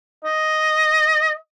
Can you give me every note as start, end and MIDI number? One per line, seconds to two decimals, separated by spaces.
0.25 1.34 75